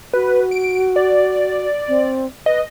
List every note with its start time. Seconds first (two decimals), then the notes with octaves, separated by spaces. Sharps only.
0.13 F#4 B4
0.51 D7
0.96 D5
1.88 C4
2.46 B4 D#5